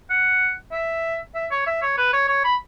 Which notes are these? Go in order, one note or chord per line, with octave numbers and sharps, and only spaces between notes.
F#5
E5
E5
C#5
E5
C#5
B4
C#5
C#5
B5